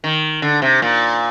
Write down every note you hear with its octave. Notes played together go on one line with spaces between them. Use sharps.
D#3
D3
C3
A#2